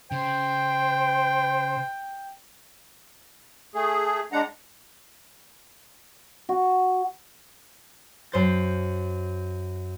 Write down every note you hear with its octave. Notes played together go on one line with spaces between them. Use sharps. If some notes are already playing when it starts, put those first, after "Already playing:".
C#3 C5 G5
A3 G#4
G#3 D4 F#5 A#5
F#4
F#2 C5 A6